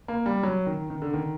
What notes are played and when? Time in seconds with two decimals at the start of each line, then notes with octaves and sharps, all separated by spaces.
0.08 A#3
0.26 G3
0.43 F#3
0.66 D#3
0.90 D#3
1.02 D3
1.13 D#3